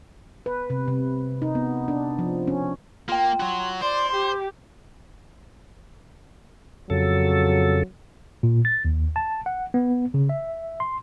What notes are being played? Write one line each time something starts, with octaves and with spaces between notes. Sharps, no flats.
B4
C3
C3
D#4
B3
D4
F3
C#4
A#3 F4 G5
F#3 F#4 C6
C5 D5 C6
G4
F2 C#3 F#3 A4
A#2
A6
D#2
A5
F#5
B3
C#3
E5
C6